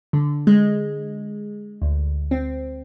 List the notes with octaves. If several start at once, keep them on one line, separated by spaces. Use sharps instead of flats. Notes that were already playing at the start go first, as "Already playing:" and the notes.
D3
G#3
D2
C4